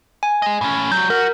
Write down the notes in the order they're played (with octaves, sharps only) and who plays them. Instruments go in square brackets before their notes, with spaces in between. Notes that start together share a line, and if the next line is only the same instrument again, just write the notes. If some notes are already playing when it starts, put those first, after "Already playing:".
[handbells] G#5
[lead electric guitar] G#4 D#5
A2 C#4
[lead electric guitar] F#3 G3 [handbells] G6
[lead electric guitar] F#4 [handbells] A#4